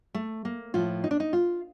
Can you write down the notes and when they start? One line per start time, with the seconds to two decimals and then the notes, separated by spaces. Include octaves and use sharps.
0.14 A3
0.45 A#3
0.74 A2 F3 F4
1.04 D#4
1.11 D4
1.20 D#4
1.33 F4